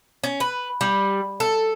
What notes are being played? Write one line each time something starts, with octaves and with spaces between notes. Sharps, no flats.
C#4
B4
G3
A4